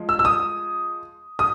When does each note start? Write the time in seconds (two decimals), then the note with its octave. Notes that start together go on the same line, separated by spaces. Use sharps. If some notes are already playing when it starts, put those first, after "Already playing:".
Already playing: F3 G#3
0.09 E6
0.19 E6
0.25 D#6
1.39 D#6